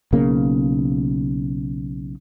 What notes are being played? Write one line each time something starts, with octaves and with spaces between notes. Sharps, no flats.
B1 C#3 A#3